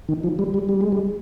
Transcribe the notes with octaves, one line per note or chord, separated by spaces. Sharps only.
D#3
F3
G3
G3
G3
G#3
G3